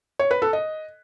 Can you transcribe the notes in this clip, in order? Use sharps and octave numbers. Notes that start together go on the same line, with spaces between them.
C#5
B4
A4
D#5